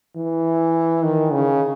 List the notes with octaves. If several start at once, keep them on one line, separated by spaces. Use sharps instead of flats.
E3
D#3
C#3